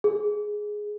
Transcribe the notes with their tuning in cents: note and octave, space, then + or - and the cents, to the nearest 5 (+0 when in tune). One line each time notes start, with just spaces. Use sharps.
G#4 +5